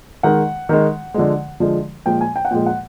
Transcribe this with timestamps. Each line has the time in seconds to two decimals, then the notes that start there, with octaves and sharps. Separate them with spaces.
0.23 D#3 G#3 F#5
0.69 D#3 G#3
1.14 D3 F3 G#3
1.60 D3 F3 G#3
2.06 A#2 F3 G#3 G5
2.21 G#5
2.36 G5
2.45 F#5
2.51 A#2 F3 G#3 G5
2.66 F#5